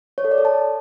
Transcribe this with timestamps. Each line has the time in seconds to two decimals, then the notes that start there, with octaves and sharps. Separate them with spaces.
0.18 C#5
0.25 A4
0.31 D5
0.38 A4
0.45 A5